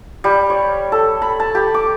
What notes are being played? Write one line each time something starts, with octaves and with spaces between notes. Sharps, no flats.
G3
C#5
A4
B5
A5
G4
D6